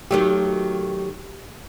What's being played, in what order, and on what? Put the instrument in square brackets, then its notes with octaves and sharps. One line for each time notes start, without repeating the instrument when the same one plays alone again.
[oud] D#3 F#3 A3 [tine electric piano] G4